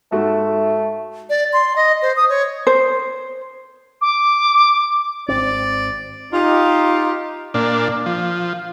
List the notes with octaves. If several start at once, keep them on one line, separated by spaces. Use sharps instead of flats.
G#2 A3 F#4 A4
D5
C6
D#5
C5
D#6
C#5
C5
D6
G#1 C4 D5
D#4 F4 G4
A#2 D4
F3